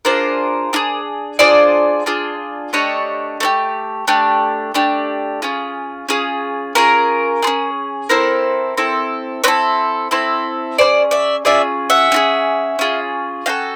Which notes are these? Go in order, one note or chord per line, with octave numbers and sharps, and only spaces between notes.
D4 F4 G#4 A#4 C5
D4 F4 G#4
D4 F4 G#4 C5 D5
D4 F4 G#4
A3 D4 G4 C#5 D#5
A3 D4 G4
A3 D4 G4
A3 D4 G4
C#4 F4 G#4
C#4 F4 G#4
C#4 F4 G#4 A#4
C#4 F4 G#4
C4 E4 A4 A#4 C5
C4 E4 A4
C4 E4 A4 B4 C#5
C4 E4 A4
C#4 F4 G#4 C5 D5
D5 E5
C#4 F4 G#4 D5 E5
E5 F#5
C#4 F4 G#4
C#4 F4 G#4
C#4 F#4 A4 F5 G5